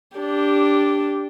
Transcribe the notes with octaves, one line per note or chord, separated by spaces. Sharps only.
D4 G4